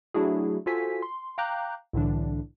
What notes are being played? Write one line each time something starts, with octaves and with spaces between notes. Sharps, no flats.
F#3 A3 D4 E4 F#4 G#4
F4 F#4 A4 C5 G#5 B6
C6
F5 G5 A#5 D6 F#6 G6
C2 A2 D3 E3 D4